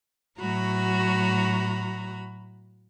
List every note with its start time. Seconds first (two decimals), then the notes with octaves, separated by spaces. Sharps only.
0.38 A2 F#3 F#4 A#5 B5